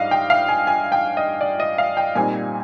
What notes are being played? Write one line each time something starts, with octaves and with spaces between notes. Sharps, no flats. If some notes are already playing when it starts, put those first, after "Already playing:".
Already playing: G#2 G3 D4 D#5 F5
G5
F5
G#5
G#5
G5
D#5
D5
D#5
F5
G5
A#2 G3 C4 D#4 G#5